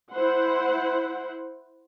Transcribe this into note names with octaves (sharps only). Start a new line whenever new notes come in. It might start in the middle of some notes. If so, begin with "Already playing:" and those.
E4 C5 F#5